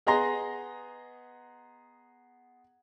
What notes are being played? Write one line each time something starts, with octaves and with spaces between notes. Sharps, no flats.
B3 G#4 D#5 A#5 C6 A#6